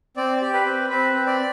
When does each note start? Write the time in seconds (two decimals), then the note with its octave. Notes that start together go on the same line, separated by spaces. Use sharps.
0.17 C4 D5
0.41 G4
0.54 B4
0.65 C4
0.89 C4 B4
1.14 C4
1.27 D5